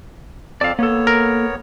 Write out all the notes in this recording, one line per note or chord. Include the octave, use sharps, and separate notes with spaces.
F2 C4 D5 F5 A5
A#3 B3 A4 C#5
A#4